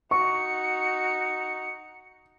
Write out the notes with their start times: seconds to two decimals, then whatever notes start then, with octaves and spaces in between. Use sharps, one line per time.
0.11 D#4 F#4 C#6 C#7